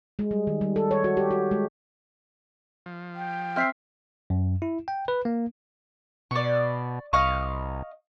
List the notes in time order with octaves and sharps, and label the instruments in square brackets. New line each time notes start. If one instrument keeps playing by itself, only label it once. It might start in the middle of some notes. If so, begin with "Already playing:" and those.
[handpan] G#3
G3
D#3
G3
A4
C#5
F#4
G4
F#4
G#3
[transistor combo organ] F3
[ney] G5
[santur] C4 E5 [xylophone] F6 B6 C7
[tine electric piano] F#2
E4
G5
B4
A#3
[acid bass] B2 [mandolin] D5 C#6
[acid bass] C2 [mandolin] D#5 F5 C#6